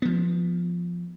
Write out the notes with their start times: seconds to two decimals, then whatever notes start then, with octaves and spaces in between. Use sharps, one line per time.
0.02 F3 B3